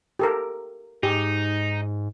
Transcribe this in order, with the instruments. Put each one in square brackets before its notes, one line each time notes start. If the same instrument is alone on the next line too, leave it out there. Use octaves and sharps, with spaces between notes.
[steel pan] G4 A4 A#4
[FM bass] G#2 [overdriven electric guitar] D#4 [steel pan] G4